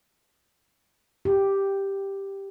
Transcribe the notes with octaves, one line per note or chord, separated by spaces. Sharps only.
G4